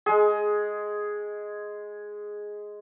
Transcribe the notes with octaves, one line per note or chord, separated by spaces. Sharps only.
G#3 G#4